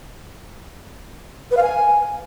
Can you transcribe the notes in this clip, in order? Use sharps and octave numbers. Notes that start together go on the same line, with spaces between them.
B4
F5
G#5